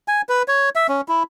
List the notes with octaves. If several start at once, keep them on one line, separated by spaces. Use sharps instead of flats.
G#5
B4
C#5
E5
C#4
E4